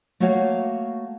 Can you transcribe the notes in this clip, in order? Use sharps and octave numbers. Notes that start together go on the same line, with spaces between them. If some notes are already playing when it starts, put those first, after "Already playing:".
A3 A#3 F#4 C#5 F5 F#5